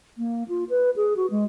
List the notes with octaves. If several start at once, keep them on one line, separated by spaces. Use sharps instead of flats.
A#3
F4
B4
G#4
F#4
G#3